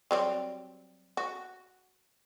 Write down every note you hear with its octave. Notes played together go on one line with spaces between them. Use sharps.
F#3 G3 C4
F#4